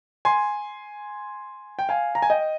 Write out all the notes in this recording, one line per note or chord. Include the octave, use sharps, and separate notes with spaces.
G#5 C6
G5
F5 G#5
A#5
G#5
D#5 G5